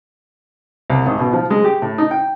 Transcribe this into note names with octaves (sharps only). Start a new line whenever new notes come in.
C2
G#1
B2
F3
G#3
G4
A2
D#4
G5